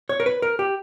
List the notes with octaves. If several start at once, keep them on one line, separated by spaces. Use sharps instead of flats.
C#5
A#4
B4
A#4
G4